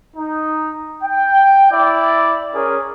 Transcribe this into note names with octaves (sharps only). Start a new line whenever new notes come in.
D#4
G5
E4 D5
C#4 G#4 A#4